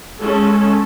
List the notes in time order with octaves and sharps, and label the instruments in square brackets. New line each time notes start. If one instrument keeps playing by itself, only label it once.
[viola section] G#3 C#4 A4